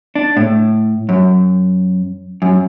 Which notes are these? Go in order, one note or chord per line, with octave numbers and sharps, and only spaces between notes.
D4
A2
F#2
F#2